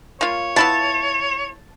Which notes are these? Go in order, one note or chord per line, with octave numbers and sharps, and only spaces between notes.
A#3 F4 C#5
B3 E4 F4 A5